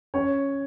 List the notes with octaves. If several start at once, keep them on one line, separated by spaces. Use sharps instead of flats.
C#4 C#5